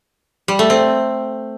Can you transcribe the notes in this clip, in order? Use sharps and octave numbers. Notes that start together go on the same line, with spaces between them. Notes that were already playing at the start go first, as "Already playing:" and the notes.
G3
A3
C4